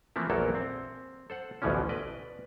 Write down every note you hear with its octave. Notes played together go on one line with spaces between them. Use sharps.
E3 F3 A3 A#3 C4 E4
A#1 E2 F#3 A#3 A4 A#4
C4
A4 C5 F#5
A1 D2 B2 E3 F3 C#4
B4 D5 D#5